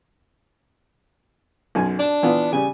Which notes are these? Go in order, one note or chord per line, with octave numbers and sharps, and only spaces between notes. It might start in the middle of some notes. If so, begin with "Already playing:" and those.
B1 F#2 G#5
D4 A5
E3 B3 F4
C#3 G3 G#5